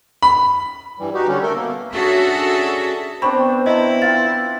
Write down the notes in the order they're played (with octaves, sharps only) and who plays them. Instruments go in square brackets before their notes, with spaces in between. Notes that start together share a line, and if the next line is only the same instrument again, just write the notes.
[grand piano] B5
[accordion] G2 E3 G3
D#4 F#4 G4
D3 G3 C#4
A3 A4 A#4
B2 A#3
[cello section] C#4 D4 F#4 G#4 A4 E5
[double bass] B3 [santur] C4 D4 G5 [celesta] B5 C#6
[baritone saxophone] E4 [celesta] D#5 [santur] A5 A#5
[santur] F4 G5 [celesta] A6